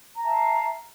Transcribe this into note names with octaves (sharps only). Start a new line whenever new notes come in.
E5 F5 A5 A#5